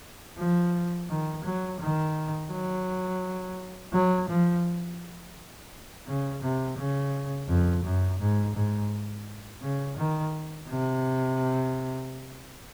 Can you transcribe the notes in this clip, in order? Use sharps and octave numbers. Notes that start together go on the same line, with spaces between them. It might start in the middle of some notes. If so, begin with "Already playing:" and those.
F3
D#3
F#3
D#3
F#3
F#3
F3
C#3
C3
C#3
F2
F#2
G#2
G#2
C#3
D#3
C3